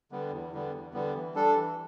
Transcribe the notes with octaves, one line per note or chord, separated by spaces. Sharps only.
D3 G3 B3
E2
D3 G3 B3
E2
D3 G3 B3
E3
G3 D4 A4
E3